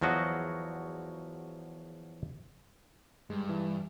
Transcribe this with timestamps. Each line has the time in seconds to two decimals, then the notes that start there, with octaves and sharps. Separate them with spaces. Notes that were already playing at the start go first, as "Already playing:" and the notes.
0.01 E2 F3 F#3 F#4 D#5
3.30 G2 G#3
3.49 E3